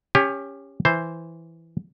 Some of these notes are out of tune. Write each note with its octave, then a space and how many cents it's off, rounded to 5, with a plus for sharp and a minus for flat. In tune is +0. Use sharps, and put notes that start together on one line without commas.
C#4 +0 G4 +25
E3 +0 C5 +0